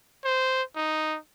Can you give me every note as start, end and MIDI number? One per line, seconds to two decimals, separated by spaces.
0.25 0.63 72
0.76 1.17 63